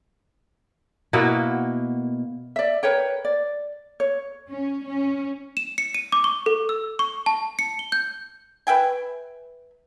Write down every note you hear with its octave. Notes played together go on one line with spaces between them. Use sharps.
B2 A#3 E4 F#4
D5 E5
A#4 B4 C#5 G5
D5
C#5
C#4
C#4
E7
C#7
D#7
D6
C#6
A4
E6
C#6
A5
C#7
G7
G6
B4 E5 G5 G#5